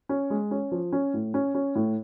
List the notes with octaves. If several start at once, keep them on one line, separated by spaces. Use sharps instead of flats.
C#4
G#3
C#4
F3
C#4
A2
C#4
C#4
A2